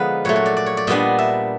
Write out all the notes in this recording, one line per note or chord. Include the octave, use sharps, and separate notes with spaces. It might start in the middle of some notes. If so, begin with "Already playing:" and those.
Already playing: D3 F3 G#3 B3 D#4 B4
A#2 F#3 A3 C#5
C#5
D5
D5
C#5
D5
A#2 G3 B3 D4 D#5
E5